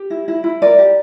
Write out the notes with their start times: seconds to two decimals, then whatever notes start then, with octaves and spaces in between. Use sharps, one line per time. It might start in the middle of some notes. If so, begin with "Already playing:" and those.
Already playing: G4
0.10 E4
0.28 E4
0.44 E4
0.62 A#4 D5
0.78 G4